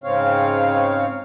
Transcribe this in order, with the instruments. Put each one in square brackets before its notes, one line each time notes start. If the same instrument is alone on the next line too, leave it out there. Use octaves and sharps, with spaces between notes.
[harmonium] G#2 C#3 C4 C#5 F5